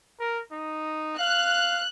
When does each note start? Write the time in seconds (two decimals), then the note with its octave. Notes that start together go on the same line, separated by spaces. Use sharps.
0.20 A#4
0.52 D#4
1.19 F5 F#6